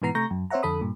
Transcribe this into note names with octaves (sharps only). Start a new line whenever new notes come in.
G#2 B2 E3 B3 A#5 C7
C3 A3 A#5 C#6 G6 A#6
F#2
C4 C5 C#5 E5 F#5 A#5
F2 D3 A4 B5 D#6
G2 A#2